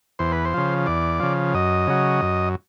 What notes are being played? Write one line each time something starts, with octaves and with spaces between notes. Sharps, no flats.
E2 C5
B4
C5
C#3 F3
E2 D5
C#3 F3
F#2 D#5
C#3 F#3
F#2